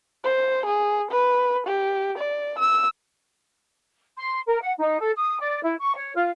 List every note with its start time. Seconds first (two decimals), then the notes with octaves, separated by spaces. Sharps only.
0.24 C5
0.66 G#4
1.11 B4
1.67 G4
2.18 D5
2.59 E6
4.17 C6
4.48 A#4
4.62 F#5
4.78 D#4
4.99 A4
5.16 D#6
5.38 D5
5.63 E4
5.78 C#6
5.95 C#5
6.15 F4